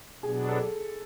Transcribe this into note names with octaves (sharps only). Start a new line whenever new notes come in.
B2 F#3 B3 D4 G#4
A4